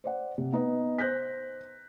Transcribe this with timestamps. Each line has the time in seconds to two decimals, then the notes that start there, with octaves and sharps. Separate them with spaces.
0.04 C5 D5 F#5
0.38 C3
0.53 B3 D#4 B4 D#5
0.98 C5 F#6 G6 A#6 B6